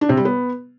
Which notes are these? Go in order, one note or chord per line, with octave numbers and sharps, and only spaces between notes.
D4
C3
G3
B3